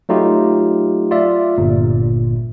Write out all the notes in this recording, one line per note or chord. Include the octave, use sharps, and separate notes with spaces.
F#3 A3 D#4 F4 G4
F4 D5 E5
G1 A#2